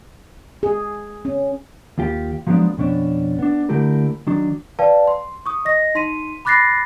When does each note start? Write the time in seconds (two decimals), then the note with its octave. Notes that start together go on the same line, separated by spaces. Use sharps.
0.63 G#4
1.25 C#4
1.98 D#2 F4 G4
2.47 F3 F#3 G#3 B3 D4
2.77 F2 B2 C#4 D4
3.39 B3 D4
3.69 D3 A3 E4 G4 A#4
4.27 D#3 F#3 D4
4.79 B4 D5 F5 G5 A5
5.07 C6
5.46 C#6 D#6
5.65 D#5 A#6
5.95 D#4 C6 B6 D#7
6.45 B5 D6 F#6 A6 A#6 C7